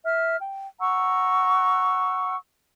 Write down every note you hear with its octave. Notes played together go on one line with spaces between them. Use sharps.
E5 F6
G5
F#5 A#5 C#6 E6